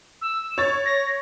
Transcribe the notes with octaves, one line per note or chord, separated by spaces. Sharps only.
E6
C#5 A6
A#6